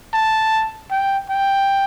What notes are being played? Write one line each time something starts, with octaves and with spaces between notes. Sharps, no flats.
A5
G5
G5